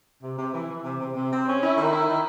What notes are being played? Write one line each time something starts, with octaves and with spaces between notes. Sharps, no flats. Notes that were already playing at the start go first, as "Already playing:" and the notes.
C3
C3
E3
E3
C3
C3
C3
C4
C#4
E4
D#3
E4
D#3